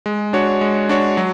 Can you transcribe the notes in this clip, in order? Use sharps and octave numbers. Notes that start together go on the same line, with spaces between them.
G#3
D4 F#4 C#5
G#3
D4 F#4 C#5
F#3